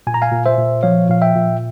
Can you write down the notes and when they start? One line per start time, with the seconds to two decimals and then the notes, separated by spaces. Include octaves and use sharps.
0.07 A#2 G#5
0.14 A#5
0.22 F5 G#5
0.32 A#2
0.46 C5 E5
0.58 A#2
0.83 F3 C#5 F5
1.09 A#2 F5
1.22 E5 G5
1.35 A#2